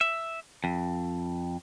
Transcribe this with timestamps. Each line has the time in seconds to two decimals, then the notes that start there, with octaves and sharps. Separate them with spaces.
0.01 E5
0.64 F2